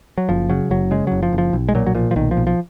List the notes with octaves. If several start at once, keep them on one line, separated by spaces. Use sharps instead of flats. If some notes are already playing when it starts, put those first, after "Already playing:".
F#3
F#1 F3
C#3 F#3
F#1 F#3
C#3 G#3
F#1 F#3
F3
F#1
F3
B1
G#3
A#2 F#3
F#3
A#2 F3
F3
B1 D#3
F3
B1
F3